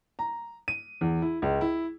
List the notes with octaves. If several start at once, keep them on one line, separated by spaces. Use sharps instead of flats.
A#5
D#7
E2
E4
C#2
E4